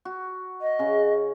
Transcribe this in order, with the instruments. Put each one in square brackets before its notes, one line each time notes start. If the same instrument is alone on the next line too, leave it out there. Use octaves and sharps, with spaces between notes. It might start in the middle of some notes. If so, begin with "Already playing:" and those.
[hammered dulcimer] F#4
[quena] D#5
[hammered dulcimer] C#3 C#4